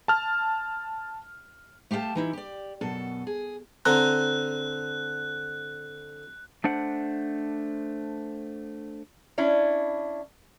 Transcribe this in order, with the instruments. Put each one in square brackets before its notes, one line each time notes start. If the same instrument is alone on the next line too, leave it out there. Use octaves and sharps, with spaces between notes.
[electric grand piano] A5 F6
[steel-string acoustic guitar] A3 G4 F5 F#5 A5
E3 D#4 E4
G4 D5
F#2 B2 A4
G#4
[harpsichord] D3 C4 A#5 [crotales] F#6
[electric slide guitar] A3 D4 C5 F#5
[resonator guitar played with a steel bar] C#4 D4 E4